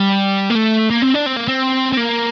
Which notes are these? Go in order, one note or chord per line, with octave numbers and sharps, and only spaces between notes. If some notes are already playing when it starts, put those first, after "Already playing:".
Already playing: G3
A#3
A3
A#3
C4
D4
C4
A#3
C4
C4
A#3